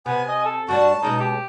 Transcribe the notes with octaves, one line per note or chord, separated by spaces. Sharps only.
C3 B3 G#5
D#5
A4
G2 G3 D4 F#4 A5
B2 G#3 C#4 D#4
G4